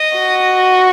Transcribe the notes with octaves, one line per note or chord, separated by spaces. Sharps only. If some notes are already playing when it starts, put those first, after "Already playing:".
Already playing: D#5
F#4